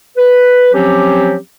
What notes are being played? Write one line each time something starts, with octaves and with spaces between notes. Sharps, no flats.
B4
F3 F#3 C4 C#4 G4